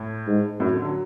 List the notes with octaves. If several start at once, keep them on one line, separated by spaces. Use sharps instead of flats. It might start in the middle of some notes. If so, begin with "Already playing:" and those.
Already playing: A2
G#2
F#2 A2
D3
F#3